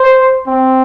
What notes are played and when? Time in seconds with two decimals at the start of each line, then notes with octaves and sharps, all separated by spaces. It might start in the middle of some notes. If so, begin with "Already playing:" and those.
Already playing: C5
0.47 C4